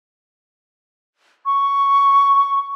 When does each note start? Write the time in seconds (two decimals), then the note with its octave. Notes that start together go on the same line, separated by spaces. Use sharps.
1.46 C#6